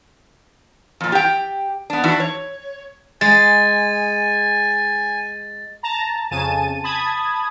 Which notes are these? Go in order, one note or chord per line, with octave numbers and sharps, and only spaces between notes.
F2 A#2
G4 G5
B3 D4
E3 D4 E4 F#4
C#5
G#3 G#5 A6
A5 A#5
F2 C#3 G#5 A5 D#7
A5 B5 D#6 G#6